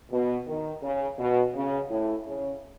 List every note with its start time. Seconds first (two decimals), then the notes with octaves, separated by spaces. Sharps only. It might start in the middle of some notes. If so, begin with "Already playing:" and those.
0.11 B2
0.47 D#3
0.82 C#3
1.19 B2
1.54 C#3
1.90 A2
2.26 C#3